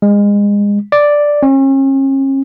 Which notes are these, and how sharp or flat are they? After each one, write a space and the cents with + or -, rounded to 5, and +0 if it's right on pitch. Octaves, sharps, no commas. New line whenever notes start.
G#3 -30
D5 +0
C#4 -40